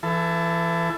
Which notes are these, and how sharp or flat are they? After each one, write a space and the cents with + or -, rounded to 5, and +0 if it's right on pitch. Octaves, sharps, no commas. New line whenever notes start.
E3 +30 A4 +0